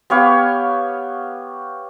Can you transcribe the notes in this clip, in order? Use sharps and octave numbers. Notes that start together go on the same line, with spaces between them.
B3 G4 C#5 F5